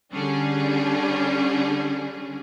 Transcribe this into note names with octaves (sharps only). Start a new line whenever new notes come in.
D3 G3 C#4 D4 G#4